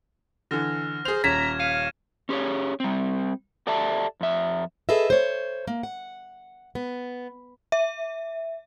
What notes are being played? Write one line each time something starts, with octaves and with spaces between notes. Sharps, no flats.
D3 E3 F6 A#6
G#4 C5 F7
D#1 C#4 A#5 G#6 A#6 B6 E7
F5 C#7 D#7
C#4 G4 G#4 C#5
G3 C4
G4 A4 D5 E5 A5
F2 E5
G#4 A4 B4 D#5 E5
C5 C#5
A#3
F#5
B3
E5